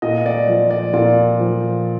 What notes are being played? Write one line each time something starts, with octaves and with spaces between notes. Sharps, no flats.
A#2 D#5
D5
F3 D5
D5
A#2 D5
F3